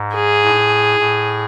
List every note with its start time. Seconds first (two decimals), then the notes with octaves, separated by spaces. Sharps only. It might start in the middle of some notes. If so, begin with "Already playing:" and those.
Already playing: G#2
0.15 G#4
0.44 A2
0.99 A2